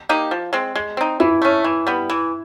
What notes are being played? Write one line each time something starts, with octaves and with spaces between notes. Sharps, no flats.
A#3 D#4 G4
F3
G#3 C4
G#3
C4 D#4
E3 E4
A3 C#4
E3
G3 B3
E3